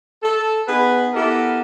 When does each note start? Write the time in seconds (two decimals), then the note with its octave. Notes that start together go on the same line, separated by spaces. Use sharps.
0.23 A4
0.67 B3 D#4 G#4 B4
1.14 B3 E4 G4 A4 A#4